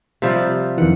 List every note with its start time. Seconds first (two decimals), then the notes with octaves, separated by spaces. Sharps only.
0.22 C3 F3 G3
0.78 F2 D#3 E3 F#5